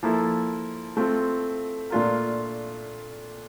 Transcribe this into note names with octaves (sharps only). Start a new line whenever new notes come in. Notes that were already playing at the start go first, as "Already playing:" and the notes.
F3 A#3 E4 A4
A3 C4 F4
A#2 A3 D4 F4 A#4